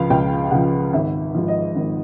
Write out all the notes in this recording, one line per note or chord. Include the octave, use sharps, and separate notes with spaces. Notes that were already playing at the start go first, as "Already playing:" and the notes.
Already playing: C#2 C#3 F3 F5
C#2 G5
C#3 F3 F#5
G#1 E5
G#2 F3
D#5
G#1